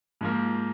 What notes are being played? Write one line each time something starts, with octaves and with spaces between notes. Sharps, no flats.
G#2 F3 A#3